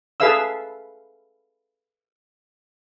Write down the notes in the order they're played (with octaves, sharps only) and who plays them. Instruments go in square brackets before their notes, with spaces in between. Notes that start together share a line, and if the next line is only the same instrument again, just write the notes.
[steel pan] G#4 A4 B4 E5 F5 E6